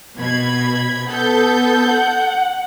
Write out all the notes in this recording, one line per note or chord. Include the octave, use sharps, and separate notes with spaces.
B2 B5 G#6
B3 A4 G6
F#5